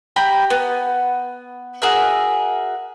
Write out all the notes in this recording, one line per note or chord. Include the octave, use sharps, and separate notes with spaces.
G4 A#5 B5
B3
F#4 G#4 A#4 E5